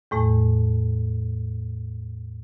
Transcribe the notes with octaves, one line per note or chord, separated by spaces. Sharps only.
E2 A2 A3